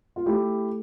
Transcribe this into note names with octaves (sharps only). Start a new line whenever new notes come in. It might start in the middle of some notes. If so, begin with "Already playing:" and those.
F4
A3 E4 G4